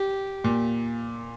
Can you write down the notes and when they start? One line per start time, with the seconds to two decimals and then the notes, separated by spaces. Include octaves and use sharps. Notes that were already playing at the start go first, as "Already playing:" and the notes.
Already playing: G4
0.44 A#2